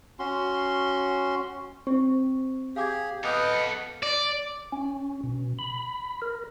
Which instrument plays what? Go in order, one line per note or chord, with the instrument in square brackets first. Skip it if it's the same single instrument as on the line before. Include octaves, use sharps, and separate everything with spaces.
[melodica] C#4 F#4 C6
[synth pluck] C4 [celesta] C#6
[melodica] G4 G#4 [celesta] F5 D6 G#6
[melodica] B3 B4 D#5 [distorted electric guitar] A4 F5 [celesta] D6 D#6 G6
[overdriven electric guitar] D5
[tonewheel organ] C#4
B2
B5
A#4